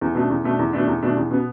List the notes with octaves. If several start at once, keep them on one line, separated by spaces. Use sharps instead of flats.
E2
B2 A3 D4
E2
B2 A3 D4
E2
B2 A3 D4
E2
B2 A3 D4
E2
B2 B3